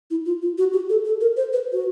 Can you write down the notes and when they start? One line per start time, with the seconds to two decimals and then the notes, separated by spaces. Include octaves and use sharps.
0.11 E4
0.25 F4
0.42 F4
0.58 F#4
0.73 G4
0.90 A4
1.05 A4
1.21 A#4
1.37 C5
1.53 B4
1.73 F#4